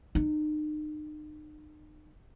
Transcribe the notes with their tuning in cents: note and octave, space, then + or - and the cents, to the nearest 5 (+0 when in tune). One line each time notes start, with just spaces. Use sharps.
D#4 -40